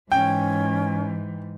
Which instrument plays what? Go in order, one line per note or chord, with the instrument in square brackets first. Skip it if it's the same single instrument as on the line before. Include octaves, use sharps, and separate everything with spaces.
[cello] G#2 E3 [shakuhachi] C#4 [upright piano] G5